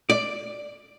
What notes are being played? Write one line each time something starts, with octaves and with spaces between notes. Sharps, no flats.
D5